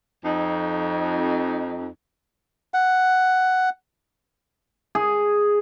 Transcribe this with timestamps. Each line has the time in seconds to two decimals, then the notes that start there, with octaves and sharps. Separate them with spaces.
0.25 F2 D#4
2.74 F#5
4.95 G#4